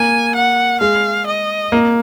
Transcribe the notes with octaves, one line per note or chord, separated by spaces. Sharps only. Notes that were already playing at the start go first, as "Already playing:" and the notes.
Already playing: A#3 G#5
F#5
G#3 F5
D#5
A#3